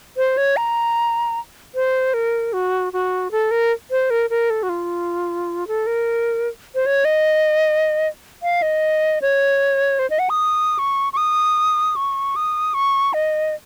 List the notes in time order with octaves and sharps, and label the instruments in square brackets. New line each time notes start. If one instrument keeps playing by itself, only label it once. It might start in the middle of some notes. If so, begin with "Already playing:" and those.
[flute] C5
C#5
A#5
C5
A#4
F#4
F#4
A4
A#4
C5
A#4
A#4
A4
F#4
F4
A4
A#4
C5
C#5
D#5
F5
D#5
C#5
C5
D#5
F#5
D#6
C#6
C#6
D#6
C#6
D#6
C#6
D#5